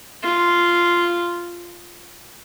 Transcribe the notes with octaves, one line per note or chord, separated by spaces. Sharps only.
F4